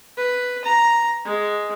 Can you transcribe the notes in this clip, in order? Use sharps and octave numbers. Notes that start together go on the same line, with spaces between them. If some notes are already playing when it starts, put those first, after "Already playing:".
B4
A#5
G#3